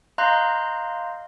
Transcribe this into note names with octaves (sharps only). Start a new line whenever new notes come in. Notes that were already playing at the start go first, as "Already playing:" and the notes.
D#5 F5 A#5 C6 F#6 G6